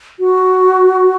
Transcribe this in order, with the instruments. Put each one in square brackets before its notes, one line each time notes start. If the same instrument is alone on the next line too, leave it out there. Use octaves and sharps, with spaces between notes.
[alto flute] F#4